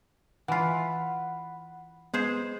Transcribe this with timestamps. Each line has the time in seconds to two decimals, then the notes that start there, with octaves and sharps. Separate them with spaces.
0.48 E3 F4 F#5 B5
2.14 G#3 B3 G#4 C5